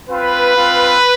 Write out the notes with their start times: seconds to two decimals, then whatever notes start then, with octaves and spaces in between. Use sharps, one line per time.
0.10 C4 F4 B4
0.55 C4 F4